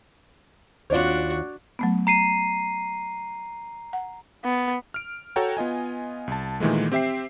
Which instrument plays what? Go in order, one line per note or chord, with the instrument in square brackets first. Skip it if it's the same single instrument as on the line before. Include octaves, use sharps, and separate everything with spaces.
[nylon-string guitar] D#2 F4 [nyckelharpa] D4 F#4 [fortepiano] C#5 D5
[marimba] F#3 A3 B3
[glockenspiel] A#5 C7 D#7
[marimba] F#5
[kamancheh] B3
[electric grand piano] F6 D7
F#4 A4 C#5 F#5 G5 A#5
B3 F4 D#5 G#5
C2 A5
A#2 D#3 E3 G#3 A3
C4 G4 E5 G5 C7